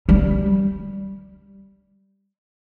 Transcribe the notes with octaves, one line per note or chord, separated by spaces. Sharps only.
G3